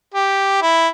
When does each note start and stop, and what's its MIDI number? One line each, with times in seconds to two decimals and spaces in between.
0.14 0.58 67
0.62 0.87 64